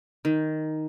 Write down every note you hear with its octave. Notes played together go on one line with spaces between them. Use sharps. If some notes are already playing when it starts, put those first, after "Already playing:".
D#3